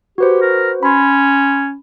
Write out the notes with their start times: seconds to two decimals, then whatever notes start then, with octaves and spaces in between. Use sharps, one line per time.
0.18 F#4 G4 B4 C5
0.41 A#4
0.83 C#4 B5 C6